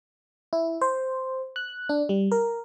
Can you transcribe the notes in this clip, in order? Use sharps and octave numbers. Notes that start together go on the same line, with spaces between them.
E4
C5
F#6
D4
G3
A#4